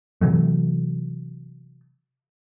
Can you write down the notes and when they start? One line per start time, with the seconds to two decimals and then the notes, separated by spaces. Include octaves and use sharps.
0.21 C3 E3 F#3 A3